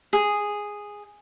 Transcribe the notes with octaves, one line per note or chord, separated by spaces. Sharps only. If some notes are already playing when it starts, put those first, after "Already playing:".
G#4